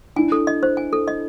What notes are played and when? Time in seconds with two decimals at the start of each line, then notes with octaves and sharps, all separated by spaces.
0.16 D4 E4 G#5
0.32 A4
0.47 D#5
0.63 C5
0.77 G#5
0.93 A4
1.08 D#5